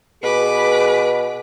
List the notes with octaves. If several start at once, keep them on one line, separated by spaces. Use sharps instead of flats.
B2 G#4 B4 D6